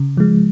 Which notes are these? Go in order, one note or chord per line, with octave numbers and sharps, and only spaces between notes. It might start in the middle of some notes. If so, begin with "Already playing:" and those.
Already playing: C#3
F3 G#3